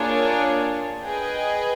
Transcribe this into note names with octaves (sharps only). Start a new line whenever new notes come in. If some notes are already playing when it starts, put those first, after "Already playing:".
Already playing: A#3 D4 F4 G#4 C#5
G#4 B4 D#5 G5